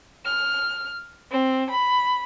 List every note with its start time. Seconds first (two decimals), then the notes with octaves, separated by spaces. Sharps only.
0.24 F6
1.31 C4
1.69 B5